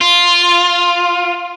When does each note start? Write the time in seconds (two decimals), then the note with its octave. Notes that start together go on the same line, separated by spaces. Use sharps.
0.01 F4